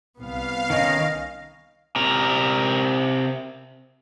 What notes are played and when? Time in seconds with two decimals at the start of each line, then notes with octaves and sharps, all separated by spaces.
0.19 C2 B3 F5
0.70 D#3 C#4 D#5
1.96 C3 A#4